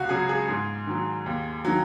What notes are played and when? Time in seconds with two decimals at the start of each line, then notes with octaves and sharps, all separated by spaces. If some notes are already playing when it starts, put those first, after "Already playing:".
Already playing: C#2 F#4
0.09 C#3 F#3 G#4
0.29 G#4
0.48 G#2 G#4
0.87 D#3 F#3
1.26 D#2
1.65 D#3 F#3